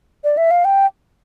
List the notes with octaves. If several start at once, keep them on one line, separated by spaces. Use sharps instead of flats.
D5
E5
F5
G5